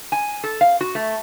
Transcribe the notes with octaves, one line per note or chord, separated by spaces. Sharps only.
G#5
A4
F5
F#4
A3